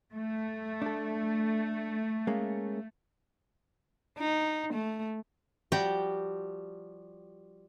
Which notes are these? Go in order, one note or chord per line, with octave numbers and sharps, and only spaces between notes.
A3
D4 A4
G#3 A#3 C#4
D#4
A3
F3 G3 F#4 G4 G5